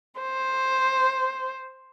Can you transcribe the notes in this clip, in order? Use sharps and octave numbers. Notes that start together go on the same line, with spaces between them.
C5